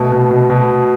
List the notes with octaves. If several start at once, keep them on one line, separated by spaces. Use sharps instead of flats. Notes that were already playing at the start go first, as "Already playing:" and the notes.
Already playing: B2 A3
B2
B2
B2